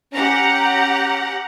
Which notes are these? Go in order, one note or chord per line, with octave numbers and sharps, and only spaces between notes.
C#4 G4 F#5 A#5